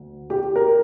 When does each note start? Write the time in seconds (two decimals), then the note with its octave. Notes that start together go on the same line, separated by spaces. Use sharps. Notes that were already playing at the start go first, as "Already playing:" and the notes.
Already playing: D2
0.30 G4
0.56 A#4